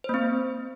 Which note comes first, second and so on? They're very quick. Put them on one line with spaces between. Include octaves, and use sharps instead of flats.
C5 A#3 C4